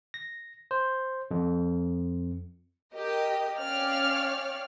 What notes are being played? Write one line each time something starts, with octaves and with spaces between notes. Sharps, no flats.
A#6
C5
F2
G4 A#4 D#5
C#4 C#5 D5 F5 G5 F6